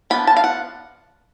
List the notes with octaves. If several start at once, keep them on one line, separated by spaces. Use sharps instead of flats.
F3 B3 D4 B5
A5
F5
F#5